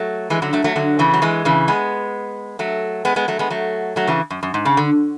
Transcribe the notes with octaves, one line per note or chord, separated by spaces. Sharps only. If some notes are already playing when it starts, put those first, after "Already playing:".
Already playing: F#3 A3
E3 G#3
D3 F#3
F#3 A3
F#3 A3
D3 F#3
C#3 E3
F#3
E3 G#3
C#3 E3
G#3 B3
F#3 A3
G#3 B3
G#3 B3
F#3 A3
G#3 B3
F#3 A3
F#3 A3
C#3 E3
F#2
F#2
G#2
C#3
D3